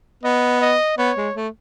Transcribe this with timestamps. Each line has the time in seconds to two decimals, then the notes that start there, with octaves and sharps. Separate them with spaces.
0.23 B3 D#5
0.61 D#5
0.98 B3 C#5
1.17 G#3
1.35 A3